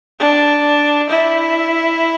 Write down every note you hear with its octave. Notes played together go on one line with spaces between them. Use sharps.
D4
E4